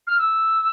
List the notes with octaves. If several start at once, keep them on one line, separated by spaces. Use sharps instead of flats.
F6
E6